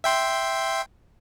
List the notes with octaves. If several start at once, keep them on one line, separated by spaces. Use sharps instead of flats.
E5 G5 C6